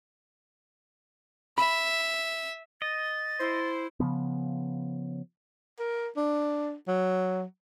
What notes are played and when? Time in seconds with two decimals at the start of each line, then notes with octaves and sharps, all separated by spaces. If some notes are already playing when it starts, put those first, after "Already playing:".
1.58 E5 B5
2.82 D#5 A6
3.40 E4 C5
4.00 C#3 F3 B3
5.79 A#4
6.16 D4
6.88 F#3